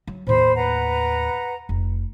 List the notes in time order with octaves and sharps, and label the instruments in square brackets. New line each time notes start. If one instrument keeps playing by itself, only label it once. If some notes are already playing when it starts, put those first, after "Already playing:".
[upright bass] F#3
[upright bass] D#2 A2 [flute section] C5 B5
[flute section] B4 F#5 A#5
[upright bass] F1